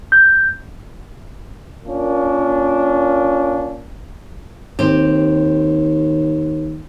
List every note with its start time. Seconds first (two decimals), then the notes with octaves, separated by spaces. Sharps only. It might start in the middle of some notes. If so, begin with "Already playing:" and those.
0.12 G6
1.85 A#2 A#3 C#4 D4
4.79 D#2 C4 G4